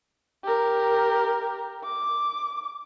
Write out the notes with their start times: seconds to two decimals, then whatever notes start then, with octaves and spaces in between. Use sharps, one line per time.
0.44 G4 A#4
1.85 D6